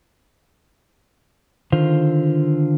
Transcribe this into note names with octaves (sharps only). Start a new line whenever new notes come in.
D3 D#3 F4 C5